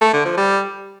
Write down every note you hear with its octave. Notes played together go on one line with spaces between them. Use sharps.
A3
D3
F3
G3